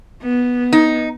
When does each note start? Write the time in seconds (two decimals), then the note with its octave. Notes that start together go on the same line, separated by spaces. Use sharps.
0.22 B3
0.73 D#4